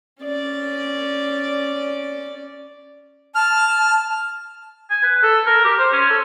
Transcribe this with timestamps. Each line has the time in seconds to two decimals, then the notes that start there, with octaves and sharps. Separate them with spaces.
0.23 C#4 D5
3.35 A5 F6
4.90 G#5
5.03 B4
5.23 A4
5.47 A#4
5.65 G4
5.79 C5
5.93 C#4
6.11 A4